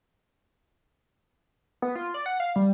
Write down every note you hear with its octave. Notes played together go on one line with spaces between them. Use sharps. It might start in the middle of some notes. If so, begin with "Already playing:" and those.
B3
F4
D5
F#5
F5
G3